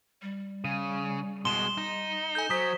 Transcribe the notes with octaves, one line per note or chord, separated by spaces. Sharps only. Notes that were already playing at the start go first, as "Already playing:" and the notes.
G3
C#3 D#7
B2 G#3 C6 E7 G7
D#4
A4 G#5 G6
F#3 C5 D#6 B6